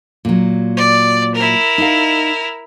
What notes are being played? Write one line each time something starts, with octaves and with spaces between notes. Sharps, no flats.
A#2 F#3
D5
E4 A#4
D#4 D#5 F5